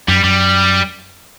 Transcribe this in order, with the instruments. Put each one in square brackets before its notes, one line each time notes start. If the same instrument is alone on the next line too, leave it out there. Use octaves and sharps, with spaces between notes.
[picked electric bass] F#2 [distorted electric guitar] G3
[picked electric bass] F#2 [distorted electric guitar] G3